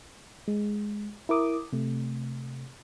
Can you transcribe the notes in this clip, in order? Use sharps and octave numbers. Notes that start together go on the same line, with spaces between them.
G#3
E4 A#4 D6 D#6
C3 A3